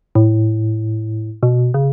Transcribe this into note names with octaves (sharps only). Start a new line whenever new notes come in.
A2
B2
C#3